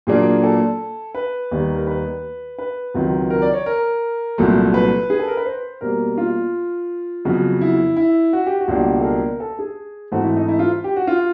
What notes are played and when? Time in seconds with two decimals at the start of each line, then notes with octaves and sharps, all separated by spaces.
0.07 A#2 F#3 A#3 D4 G#4
0.44 A4
1.15 B4
1.51 D#2 D#3 G3
1.75 A#4
1.87 B4
2.59 B4
2.94 C#2 C3 D#3 F#3
3.30 A#4
3.42 D5
3.54 C#5
3.66 A#4
4.38 C2 A#2 F#3 A3
4.74 B4
5.10 G#4
5.19 A4
5.28 A#4
5.37 B4
5.46 C5
5.81 B2 G3 A#3 A#4
6.18 F4
7.25 F2 C#3 F#3 B3
7.61 E4
7.97 E4
8.33 F#4
8.46 G4
8.60 F#4
8.68 C#2 B2 G3 A#3 D4
9.00 A4
9.04 A#4
9.40 A4
9.59 G#4
10.11 G#2 E3 A3 C4 F#4
10.24 E4
10.36 D#4
10.48 E4
10.59 F4
10.84 G4
10.96 F#4
11.07 F4